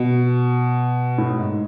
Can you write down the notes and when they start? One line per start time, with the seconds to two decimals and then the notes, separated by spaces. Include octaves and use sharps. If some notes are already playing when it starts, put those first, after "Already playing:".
Already playing: B2
1.18 A2
1.38 G#2